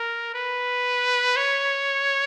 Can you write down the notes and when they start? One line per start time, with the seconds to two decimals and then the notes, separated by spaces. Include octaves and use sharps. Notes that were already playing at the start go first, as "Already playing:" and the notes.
Already playing: A#4
0.34 B4
1.36 C#5